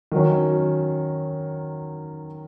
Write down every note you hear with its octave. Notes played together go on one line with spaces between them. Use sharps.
D#3 F#3 C#4